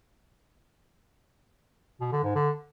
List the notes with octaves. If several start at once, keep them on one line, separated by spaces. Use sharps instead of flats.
B2
D3
G#2
D3